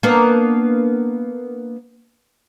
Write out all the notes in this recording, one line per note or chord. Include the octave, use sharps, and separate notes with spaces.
A#3 B3 D4